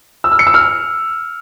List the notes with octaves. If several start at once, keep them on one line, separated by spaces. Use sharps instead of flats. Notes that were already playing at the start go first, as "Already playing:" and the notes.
E6
F6
C#7
E6
F6